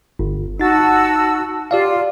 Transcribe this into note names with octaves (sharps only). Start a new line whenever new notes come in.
G1
D#4 F#4 A5 E6 A6
F4 G4 D5 F5